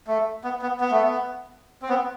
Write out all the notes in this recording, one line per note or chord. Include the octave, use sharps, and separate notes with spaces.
A3
B3
B3
B3
A3
B3
C4
B3